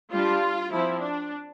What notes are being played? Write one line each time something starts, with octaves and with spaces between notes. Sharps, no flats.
G3 D4 F4
F3 C4 E4
D4